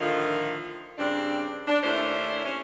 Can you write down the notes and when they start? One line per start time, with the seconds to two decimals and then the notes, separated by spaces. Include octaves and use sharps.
0.01 A2 D3 D#3 F3 F4
0.98 G2 C#3 C4 D4
1.68 D4
1.83 D#2 A3 C#4 D4 E4 C5
2.46 C#4